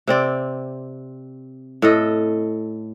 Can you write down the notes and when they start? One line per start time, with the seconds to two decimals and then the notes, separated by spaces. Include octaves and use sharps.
0.07 C3 C4 D5
1.82 A2 A4 D#5